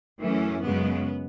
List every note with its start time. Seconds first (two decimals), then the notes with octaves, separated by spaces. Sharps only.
0.20 F#2 E3 A3 C#4
0.62 F#2 C#3 G#3 B3